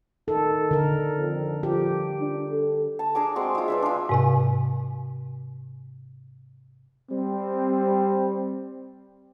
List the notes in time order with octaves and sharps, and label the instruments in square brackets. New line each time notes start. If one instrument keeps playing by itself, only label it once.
[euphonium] D#3 [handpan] A4
[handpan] D3 A#4
[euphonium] F2
[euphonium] F3 [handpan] G4
[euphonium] D4
A4
[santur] A5
D4 G#4 A#4 D6
G#3 C4 F#4
G#3 F4
B4 D5 E5
D4 F4
[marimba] G#2 C3 G#5
[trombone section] G3 C4